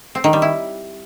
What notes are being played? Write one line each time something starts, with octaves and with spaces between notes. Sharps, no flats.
C4
D#3
G3
E4